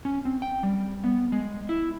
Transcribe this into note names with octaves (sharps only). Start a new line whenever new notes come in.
C#4
C4
G5
G3
B3
G#3
E4